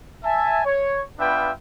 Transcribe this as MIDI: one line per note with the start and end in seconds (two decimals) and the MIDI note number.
0.24 0.62 76
0.24 0.62 80
0.24 0.62 81
0.65 1.04 73
1.19 1.51 59
1.19 1.51 62
1.19 1.51 65
1.19 1.51 71
1.19 1.51 76
1.19 1.51 79